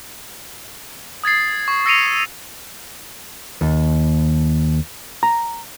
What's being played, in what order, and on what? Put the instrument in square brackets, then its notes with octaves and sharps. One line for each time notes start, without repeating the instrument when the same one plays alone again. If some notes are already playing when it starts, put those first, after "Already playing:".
[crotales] D#6 G#6 A6 C7
C#6
E6 A#6 C7 C#7 D#7 F7
[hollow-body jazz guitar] D#2
A#5